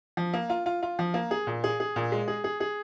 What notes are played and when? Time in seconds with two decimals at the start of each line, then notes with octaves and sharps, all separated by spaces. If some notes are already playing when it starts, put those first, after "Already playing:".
0.17 F3
0.33 A#3
0.50 F4
0.66 F4
0.83 F4
0.99 F3
1.14 A#3
1.31 G#4
1.47 A#2
1.64 G#4
1.80 G#4
1.96 A#2
2.12 G#3
2.28 G#4
2.44 G#4
2.60 G#4